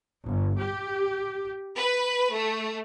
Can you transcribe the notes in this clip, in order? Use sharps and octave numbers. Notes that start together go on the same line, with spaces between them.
G1
G4
B4
A3